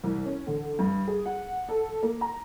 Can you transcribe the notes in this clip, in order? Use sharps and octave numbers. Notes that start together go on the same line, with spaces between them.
C2
C#4
D3
G2
G#4
F#5
A4
A#3
A#5